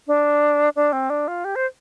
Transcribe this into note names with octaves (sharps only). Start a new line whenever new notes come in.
D4
D4
C4
D4
F4
G4
C5